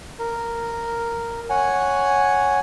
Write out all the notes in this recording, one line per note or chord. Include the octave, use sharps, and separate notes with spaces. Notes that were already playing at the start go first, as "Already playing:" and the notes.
A#4
C#5 F#5 G#5